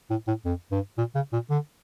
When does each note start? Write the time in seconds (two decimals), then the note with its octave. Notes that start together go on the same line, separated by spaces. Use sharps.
0.10 A2
0.28 A2
0.45 F2
0.71 G2
0.98 A#2
1.15 C#3
1.33 A#2
1.50 D3